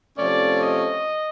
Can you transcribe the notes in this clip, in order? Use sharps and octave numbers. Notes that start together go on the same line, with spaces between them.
C3 F3 A3 C#4 D5
D#5